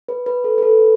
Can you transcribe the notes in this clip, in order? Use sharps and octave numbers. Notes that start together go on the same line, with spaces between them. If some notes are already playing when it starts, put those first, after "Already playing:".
B4
B4
A4
B4
A4